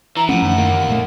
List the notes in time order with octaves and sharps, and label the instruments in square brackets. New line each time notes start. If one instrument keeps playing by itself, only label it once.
[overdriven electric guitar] E3 [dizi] A#5
[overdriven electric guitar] A2 [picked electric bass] F3 C#4 [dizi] F#5
[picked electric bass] F#2 D3 D#3
[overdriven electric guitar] D#2 A#3
[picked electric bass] A#2 A3